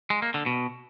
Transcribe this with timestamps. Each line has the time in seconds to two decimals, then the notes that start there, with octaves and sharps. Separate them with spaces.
0.10 G#3
0.22 A#3
0.34 D3
0.46 B2